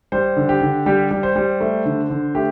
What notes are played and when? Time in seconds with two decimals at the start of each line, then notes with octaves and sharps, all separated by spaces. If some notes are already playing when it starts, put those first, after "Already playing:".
0.12 G3 C5
0.37 D3
0.49 G4
0.62 D3
0.86 G3 G4
1.11 G3
1.23 C5
1.36 G3
1.61 A3
1.85 D3
2.10 D3
2.35 A3 G4